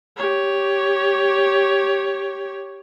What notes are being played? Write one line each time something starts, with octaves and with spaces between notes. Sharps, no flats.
G4 C#5